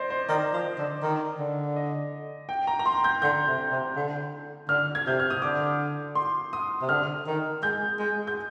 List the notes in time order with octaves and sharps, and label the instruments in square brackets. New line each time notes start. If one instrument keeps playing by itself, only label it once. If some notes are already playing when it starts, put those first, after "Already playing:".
Already playing: [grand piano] C5 D5 D#5
C5
[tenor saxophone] D#3 [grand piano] D5
[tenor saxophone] F3
D3
D#3
D3
[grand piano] D#5
G5
A#5
A#5
C6
G6
[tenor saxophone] D3 [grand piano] G6
[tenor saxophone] C3
C3
D3
[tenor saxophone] D3 [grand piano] F6
[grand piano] G#6
[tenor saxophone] C3 [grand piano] G6
[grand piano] F6
D#6
[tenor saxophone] D3 [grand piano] D6
[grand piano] C6
D#6
[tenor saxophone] C3
[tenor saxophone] D3 [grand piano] F6
[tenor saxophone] D#3
[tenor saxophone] G#3 [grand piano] G6
[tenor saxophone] G#3
[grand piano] G6